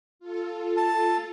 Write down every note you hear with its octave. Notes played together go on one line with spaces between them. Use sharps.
F4 A4
A5